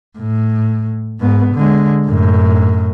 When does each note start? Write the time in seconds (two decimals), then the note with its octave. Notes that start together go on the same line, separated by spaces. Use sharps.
0.18 A2
1.20 G#2 B3
1.55 D3 G#3
2.06 F#2 A2